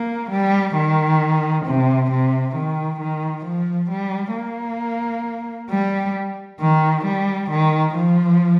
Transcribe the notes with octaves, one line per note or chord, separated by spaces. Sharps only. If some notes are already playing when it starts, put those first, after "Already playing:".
Already playing: A#3
G3
D#3
C3
C3
D#3
D#3
F3
G3
A#3
G3
D#3
G3
D#3
F3